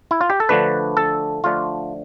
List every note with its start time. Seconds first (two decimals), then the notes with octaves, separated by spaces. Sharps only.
0.11 E4
0.21 F4
0.30 G4
0.40 A4
0.49 D3 F3 A3 D4 B4
0.97 A4
1.44 D3 F3 A3 D4 F4